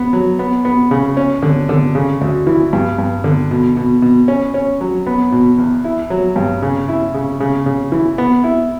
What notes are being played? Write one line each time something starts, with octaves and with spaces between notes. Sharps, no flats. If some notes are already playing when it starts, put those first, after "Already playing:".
Already playing: B3
F#3
B3
B3
C#3
C#4
D3
D3
C#3
D2
E3
G2
G2
D3
B2
B2
B2
C#4
C#4
F#3
B3
B2
E2
E4
F#3
G2
C#3
E4
C#3
C#3
C#3
E3
B3
E4